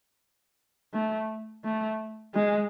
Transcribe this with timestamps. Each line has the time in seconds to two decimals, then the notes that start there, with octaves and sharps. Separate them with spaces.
0.94 A3
1.64 A3
2.35 G#3